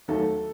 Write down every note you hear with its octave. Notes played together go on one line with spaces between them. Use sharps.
D#2 D#3 F#3 A3 A4